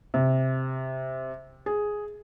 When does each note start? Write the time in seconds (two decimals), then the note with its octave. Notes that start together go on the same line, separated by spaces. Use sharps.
0.14 C3
1.66 G#4